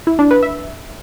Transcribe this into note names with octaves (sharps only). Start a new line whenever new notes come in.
E4
D4
B4
E5